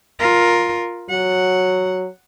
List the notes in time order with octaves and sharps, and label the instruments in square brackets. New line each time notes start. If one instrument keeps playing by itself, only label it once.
[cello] F4 A#4
[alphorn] F#3 [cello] F#5